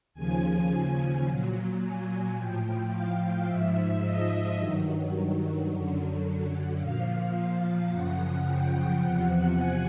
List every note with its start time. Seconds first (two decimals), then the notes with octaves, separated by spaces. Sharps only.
0.14 D#2 C#3 F3 G#5
1.24 A#2 F#3
1.80 G#5
2.36 A2 F3 G5
2.91 F5
3.46 G#2 F3 E5
4.02 D#5
4.57 G2 D#3 F#3
5.68 F#2 D3 F#3
6.79 A#2 F3 F5
7.34 F5
7.90 F#2 C#3 F3 F#5
8.45 G5
9.01 E2 C3 F3 F#5
9.56 G#5